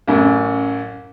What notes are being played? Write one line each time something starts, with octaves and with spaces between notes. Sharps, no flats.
A1 F#2